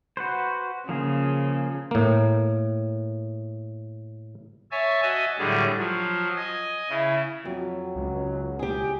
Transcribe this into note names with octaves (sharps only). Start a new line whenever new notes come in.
F#4 B4 C5
C#3 F3 A#3 G#4
A2 A#3
C#5 E5 G#5 A5
F#4 D#5 E5 G#5 A5
A2 D3 F#3 G3 D4 G#4
F3 F#3
D#5 G#5
C#3 E4
F2 F#3
C#2
G4 G#4